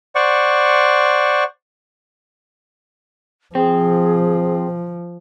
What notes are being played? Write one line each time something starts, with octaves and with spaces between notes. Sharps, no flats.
C5 D5 F#5 C#6
F3 C4 G#4